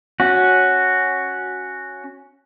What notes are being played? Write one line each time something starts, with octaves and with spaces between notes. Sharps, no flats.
C#4 F#4